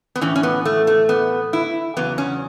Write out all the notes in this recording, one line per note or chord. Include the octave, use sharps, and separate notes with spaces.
B3
A2 E3 C#4
C#4
B3
A3
A3
B3
E4
E2 C#3 F#3 B3
C#4